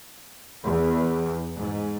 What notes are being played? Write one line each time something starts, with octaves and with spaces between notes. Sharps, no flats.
E2
G#2